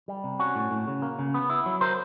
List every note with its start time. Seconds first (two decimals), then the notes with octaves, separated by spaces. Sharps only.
0.08 G3
0.24 C3
0.39 C#4 F#4
0.56 A2
0.71 A2
0.88 C#3
1.02 A#3
1.19 C#3
1.34 B3
1.50 E4
1.66 F#3
1.81 A#4 C5